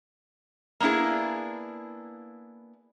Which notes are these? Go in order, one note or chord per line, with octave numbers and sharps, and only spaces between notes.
A#3 B3 D4 E4 G#4